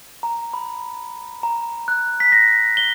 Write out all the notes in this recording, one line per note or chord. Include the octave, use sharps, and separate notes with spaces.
A#5
B5
A#5
F#6
B6
A#6
G7